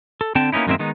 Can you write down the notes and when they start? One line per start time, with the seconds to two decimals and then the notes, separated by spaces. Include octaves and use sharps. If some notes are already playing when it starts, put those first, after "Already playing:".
0.21 A4
0.35 D3 C4 G5 A5
0.52 A#3 B3 C#4 D#4 E4
0.67 F#2 D#3 G#3 A#3 C4 E5
0.79 D#3 G#3 B3 D#4